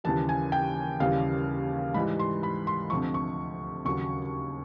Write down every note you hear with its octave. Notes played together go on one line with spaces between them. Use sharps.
D#2 C#3 E3 G3 A5
G#5
G5
D#2 C#3 E3 G3 F5
G#2 E3 G3 B5
C6
B5
C6
D2 C3 F3 C#6
C#6
D#2 C#3 F#3 C#6